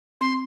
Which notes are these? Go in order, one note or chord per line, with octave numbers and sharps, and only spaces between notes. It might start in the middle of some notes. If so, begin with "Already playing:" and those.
C4 C6